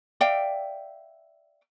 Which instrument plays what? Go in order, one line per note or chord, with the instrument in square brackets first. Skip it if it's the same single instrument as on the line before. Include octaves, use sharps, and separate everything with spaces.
[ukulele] D5 E5 F5 G5